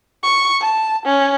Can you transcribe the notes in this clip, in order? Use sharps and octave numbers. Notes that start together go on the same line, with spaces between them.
C#6
A5
C#4